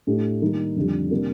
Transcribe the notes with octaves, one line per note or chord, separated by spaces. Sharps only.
A2 A3 D4 G4
D#3 G3 A#3 D#4
F2 D3 G3
C3 G3 A#3 D4